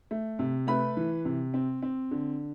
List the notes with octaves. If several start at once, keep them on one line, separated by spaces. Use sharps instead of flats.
A3
C3
A3 B4 B5
E3
C3
C4
C4
D3